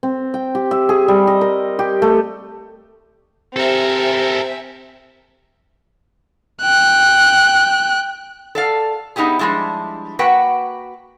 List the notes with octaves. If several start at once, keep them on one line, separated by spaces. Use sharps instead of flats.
C4
G5
G4
E5
G#4
G3
D#5
A#4
G4
A3
C4 G4 A4 A#4 E5 G#5
G5 F#6
A4 D5 F5
B3 D#4 E4 G4 G#4
F3 G3 G#3 D4 E4
A#3 F#4 B4 F#5 G5